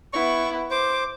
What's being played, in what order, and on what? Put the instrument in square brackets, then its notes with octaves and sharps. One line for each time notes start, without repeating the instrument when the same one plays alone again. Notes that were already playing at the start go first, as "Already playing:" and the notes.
[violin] B3 E4 [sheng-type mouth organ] C#6
[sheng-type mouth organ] C5 [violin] D6